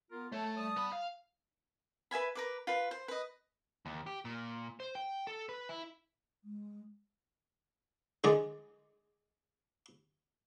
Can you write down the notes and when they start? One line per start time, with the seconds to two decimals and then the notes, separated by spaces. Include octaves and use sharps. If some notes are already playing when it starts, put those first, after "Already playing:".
0.11 B3 F4 A#4
0.32 A3 C#5 A5
0.57 G3 A5 D#6
0.77 B3 B5
0.93 F5
2.11 B4 E5 G#5 B5
2.35 A#4 B4 D6
2.67 F4 B4
2.91 C5
3.08 B4 D#5
3.86 D#2
4.07 G4
4.25 A#2
4.80 C5
4.95 G5
5.27 A4
5.49 B4
5.69 E4
6.44 G#3
8.24 D3 G#3 G#4 D5